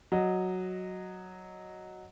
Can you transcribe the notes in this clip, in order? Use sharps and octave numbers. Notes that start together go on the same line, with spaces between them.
F#3 D#5